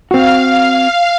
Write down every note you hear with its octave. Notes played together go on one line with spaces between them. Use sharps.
C4 F#4 F5